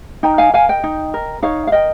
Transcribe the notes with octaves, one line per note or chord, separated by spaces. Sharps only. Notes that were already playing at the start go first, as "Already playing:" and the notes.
D#4 G5 A#5
F5 G#5
A#4 F5 G#5
D#5 G5
D#4
A#4
D#4 C#5 F5
F5
A#4 D#5 G5